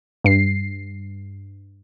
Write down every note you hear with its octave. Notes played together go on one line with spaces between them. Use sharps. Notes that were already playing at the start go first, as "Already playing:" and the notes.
G2 C7